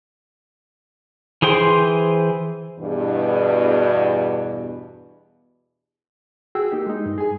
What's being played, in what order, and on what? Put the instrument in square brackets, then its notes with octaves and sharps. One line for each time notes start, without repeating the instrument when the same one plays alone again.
[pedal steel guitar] E3 G#4 C5 G5 C6
[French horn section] E2 G2 B2
[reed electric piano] F#4 G#4 G5 E6
A#3 D#4 G4
G#3 D#4
G2
G#4 G#5